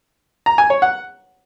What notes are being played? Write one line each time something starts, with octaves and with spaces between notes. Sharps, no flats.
A#5
G#5
C#5
F#5